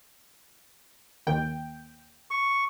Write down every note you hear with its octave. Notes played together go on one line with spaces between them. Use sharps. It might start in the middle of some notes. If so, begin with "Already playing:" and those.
D#2 G5
C#6